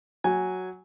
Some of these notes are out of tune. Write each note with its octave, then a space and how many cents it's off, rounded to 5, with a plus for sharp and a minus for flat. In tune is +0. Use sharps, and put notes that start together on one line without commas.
F#3 +0 G#5 +0